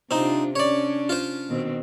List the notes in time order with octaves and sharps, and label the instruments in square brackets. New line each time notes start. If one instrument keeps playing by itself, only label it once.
[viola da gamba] C3 D4 F4 [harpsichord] C4 D#4
[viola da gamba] C#4 D4 [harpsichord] C#5 D5
[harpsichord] F4 C5
[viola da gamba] B2 D#3 C4